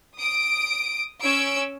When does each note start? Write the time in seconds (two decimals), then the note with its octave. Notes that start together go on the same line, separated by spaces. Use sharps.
0.18 D#6 D7
1.23 C#4 E6 D7